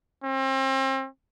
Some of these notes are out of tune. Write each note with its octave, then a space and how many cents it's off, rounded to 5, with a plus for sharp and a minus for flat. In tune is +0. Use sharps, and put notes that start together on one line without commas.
C4 +35